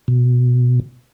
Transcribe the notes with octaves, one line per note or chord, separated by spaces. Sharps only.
B2